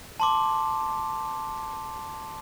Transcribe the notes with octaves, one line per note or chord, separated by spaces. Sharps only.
A5 C6 D6